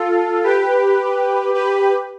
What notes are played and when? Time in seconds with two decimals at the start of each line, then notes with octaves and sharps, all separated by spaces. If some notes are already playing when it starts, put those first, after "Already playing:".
Already playing: F4 A4
0.44 G4 B4
1.54 G4 B4